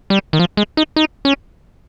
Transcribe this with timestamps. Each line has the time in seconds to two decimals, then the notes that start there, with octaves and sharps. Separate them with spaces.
0.10 G3
0.33 D#3
0.39 F3
0.57 G#3
0.77 D#4
0.96 D#4
1.25 C#4